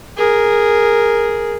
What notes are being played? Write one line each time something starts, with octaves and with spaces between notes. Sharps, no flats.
G#4 A#4